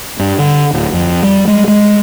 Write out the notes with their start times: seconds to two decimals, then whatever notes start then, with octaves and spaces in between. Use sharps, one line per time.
0.19 G2
0.39 D3
0.73 D1
0.93 F2
1.23 G3
1.48 G#3
1.68 G#3